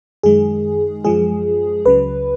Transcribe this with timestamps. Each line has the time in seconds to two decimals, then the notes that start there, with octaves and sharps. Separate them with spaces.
0.23 F#2 D#3 G#3 G#4
1.04 F#2 F3 G#3 G#4
1.86 C#2 C#3 F#3 B4